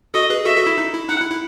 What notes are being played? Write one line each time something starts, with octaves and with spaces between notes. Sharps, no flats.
F#4 A4 D#5
G#4 B4
F#4 A4 E5
F#4 A4
E4
D#4
E4
D#4 F#5
E4
E4